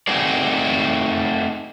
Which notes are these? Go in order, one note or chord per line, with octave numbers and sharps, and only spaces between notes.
A3 C4 D#4 F#4 G#4 D5